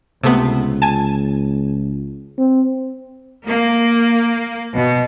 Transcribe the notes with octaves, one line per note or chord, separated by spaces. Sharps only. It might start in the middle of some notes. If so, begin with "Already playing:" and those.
C#2 C3 A3 B3
G#5 A5
C4
A#3
B2